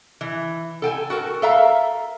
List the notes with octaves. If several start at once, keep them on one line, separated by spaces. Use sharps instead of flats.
E3
A4 G5 G#5
F#4 A4 A#4
A4 A#4 E5 F5 A#5